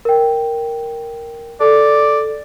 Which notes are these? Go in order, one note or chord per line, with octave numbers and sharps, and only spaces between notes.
A#4 G5
A4 D5